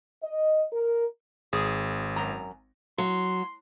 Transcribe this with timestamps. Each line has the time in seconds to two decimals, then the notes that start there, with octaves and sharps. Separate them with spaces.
0.23 D#5
0.73 A#4
1.53 G#1 G#4
2.16 F#2 A#5
2.98 F#3 C6